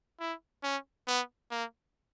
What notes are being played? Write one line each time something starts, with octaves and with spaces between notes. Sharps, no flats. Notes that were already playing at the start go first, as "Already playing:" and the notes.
E4
C#4
B3
A#3